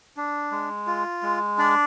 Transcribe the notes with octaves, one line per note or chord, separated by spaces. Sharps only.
D4
G#3
F4
G#3
D4 D5